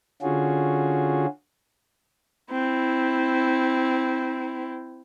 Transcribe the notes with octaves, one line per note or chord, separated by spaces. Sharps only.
D3 C#4 F4 F#4 G#4
C4 E4